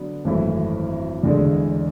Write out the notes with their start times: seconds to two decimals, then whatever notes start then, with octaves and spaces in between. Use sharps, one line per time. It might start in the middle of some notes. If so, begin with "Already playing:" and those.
Already playing: D3 F#3 B3
0.25 G#1 F#2 E3 A3 E4
1.23 E2 D3 G#3